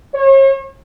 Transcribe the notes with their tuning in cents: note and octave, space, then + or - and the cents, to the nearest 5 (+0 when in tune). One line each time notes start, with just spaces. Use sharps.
C#5 -40